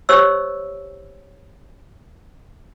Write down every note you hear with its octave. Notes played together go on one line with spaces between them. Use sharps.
G4 C5 C#5 D#5 E6